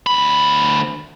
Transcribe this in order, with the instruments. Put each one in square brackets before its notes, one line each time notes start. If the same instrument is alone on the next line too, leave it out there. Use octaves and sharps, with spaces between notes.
[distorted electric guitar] D2 B5